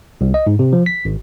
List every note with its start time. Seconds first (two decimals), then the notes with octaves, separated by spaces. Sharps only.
0.21 C2
0.34 D#5
0.47 G#2
0.59 C3
0.73 F3
0.86 B6
1.05 G#1